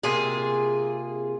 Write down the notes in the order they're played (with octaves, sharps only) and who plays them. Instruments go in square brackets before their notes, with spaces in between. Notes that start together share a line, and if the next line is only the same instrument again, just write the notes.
[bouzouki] C3 A#3 F4 G#4